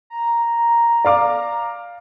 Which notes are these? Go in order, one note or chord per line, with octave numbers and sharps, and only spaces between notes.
A#5
D5 F5 D6